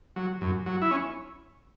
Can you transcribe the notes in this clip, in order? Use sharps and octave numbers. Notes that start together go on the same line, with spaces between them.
F#3
F#2
F#3
E4
C#4